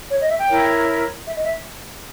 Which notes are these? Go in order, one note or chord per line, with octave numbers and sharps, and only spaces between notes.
C#5
D#5
E5
G5
E4 A#4 C#5
E5
D#5
E5